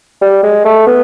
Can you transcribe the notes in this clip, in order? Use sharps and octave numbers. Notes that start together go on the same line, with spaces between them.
G3
G#3
A3
B3